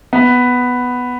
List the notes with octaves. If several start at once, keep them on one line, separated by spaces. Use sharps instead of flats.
B3